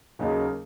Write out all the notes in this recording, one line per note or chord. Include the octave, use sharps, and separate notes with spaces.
D#2 C#3 F#3 A#3 D#4